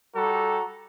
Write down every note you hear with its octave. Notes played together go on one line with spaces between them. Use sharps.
G3 F#4 G4 A4 A#5